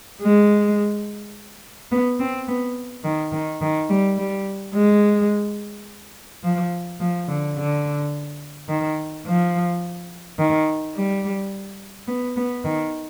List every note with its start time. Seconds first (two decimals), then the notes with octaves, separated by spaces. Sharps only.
0.22 G#3
1.92 B3
2.20 C4
2.48 B3
3.04 D#3
3.32 D#3
3.62 D#3
3.90 G3
4.18 G3
4.74 G#3
6.44 F3
7.00 F3
7.28 D3
7.57 D3
8.69 D#3
9.26 F3
10.38 D#3
10.95 G3
12.08 B3
12.37 B3
12.65 D#3